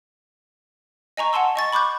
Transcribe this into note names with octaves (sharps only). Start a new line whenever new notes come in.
D#5 G#5 A#5 C#6
F#5 G#5 A5 C6 E6
D#5 C#6 A6
B5 C#6 D6 F#6 G6